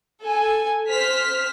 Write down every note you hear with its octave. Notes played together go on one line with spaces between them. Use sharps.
A4 G#5
C5 F6 B6